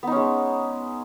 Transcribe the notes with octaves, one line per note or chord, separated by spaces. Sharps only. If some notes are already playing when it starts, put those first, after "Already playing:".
G#3 B3 C#4 D#4